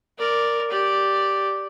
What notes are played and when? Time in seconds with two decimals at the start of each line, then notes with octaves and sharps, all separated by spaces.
0.18 A#4 D5
0.71 G4 D5